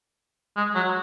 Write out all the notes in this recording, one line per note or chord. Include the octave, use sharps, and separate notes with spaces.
G#3
F#3